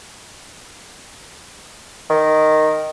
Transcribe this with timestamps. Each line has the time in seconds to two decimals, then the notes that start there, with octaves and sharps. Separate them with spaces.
2.10 D#3